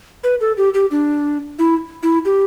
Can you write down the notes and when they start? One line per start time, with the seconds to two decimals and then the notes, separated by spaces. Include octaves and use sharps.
0.24 B4
0.41 A4
0.57 G4
0.74 G4
0.91 D4
1.59 E4
2.03 E4
2.25 G4